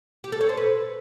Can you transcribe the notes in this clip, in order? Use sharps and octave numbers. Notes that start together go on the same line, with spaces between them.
G4
A4
C#5
C5
B4